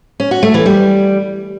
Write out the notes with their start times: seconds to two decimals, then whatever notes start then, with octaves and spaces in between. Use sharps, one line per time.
0.20 C#4
0.31 F#4
0.43 A3
0.54 E3
0.66 G3